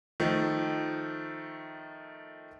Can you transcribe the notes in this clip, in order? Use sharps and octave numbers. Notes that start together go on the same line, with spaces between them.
D#3 F3 A3